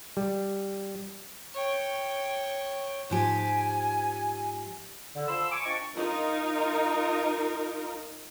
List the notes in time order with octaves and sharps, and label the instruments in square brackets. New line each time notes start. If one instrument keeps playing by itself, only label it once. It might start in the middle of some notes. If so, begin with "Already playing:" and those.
[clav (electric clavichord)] G3
[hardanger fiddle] C#5 G5
[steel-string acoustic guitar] G#2 F3 G4 [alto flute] G#5
[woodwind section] D3
F3 B5 C6 E6
G#5 C#6 D6
F3 D4 D#5 G5 C#6
[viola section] D#4 F4 A#4